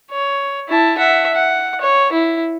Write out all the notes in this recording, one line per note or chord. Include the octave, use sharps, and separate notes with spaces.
C#5
E4 A5
E5 F#5
F#5
C#5
E4